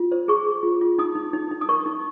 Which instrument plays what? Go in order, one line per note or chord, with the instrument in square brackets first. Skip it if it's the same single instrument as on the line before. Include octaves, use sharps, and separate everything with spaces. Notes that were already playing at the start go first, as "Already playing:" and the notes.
Already playing: [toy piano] F4
C5
G#4 C#6
G#4
F4
F4
D#4 D#6
D#4
D#4
D#4
D#6
A#4 C#6
D#4